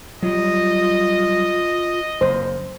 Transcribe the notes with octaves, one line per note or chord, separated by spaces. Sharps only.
F#3 G3 F4 D#5
F#1 C5